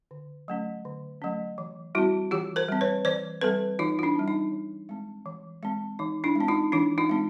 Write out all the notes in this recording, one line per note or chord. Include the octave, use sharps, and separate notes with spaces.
D3
F#3 A3 C#4
D3
F#3 A3 C#4
E3
G3 C4 E4 F#4
E3 F4 G4
A#4 C5
G3 C4
B4 C#5
E3 C5 D5
G3 C4 A4 B4
E3 D#4 F4
F4
D4 E4
G3 C4
D#4
E3
G#3 C4
E3
G#3 C4
E3 D#4
D4 E4
G#3 C4
D#4 F4
E3 D4 E4
D#4 F4
G#3 C4